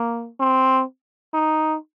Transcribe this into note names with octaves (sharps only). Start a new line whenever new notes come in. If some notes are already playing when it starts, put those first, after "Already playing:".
Already playing: A#3
C4
D#4